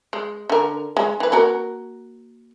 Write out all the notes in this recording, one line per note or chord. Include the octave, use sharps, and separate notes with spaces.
G#3
D3 A#4
G#3
E3 B4
A#3 F#4 A#4